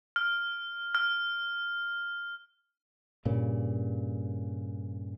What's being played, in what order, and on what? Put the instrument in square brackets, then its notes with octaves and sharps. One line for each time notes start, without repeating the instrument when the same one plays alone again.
[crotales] F6
F6
[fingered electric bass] G2 A#2 C#3